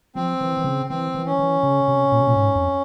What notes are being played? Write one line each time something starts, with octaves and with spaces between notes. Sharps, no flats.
F3 C4
E3
E3
C#3
E3 C4
E3
C#4
E3
C#3
C3
A#2
C3
A#2
G#2
F2